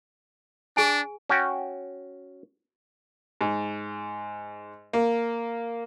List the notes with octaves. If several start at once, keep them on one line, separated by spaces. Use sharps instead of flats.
D4 G#4 G#5
C#4 F#4 G5
G#2
A#3